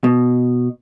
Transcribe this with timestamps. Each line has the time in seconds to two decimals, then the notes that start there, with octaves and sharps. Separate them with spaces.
0.04 B2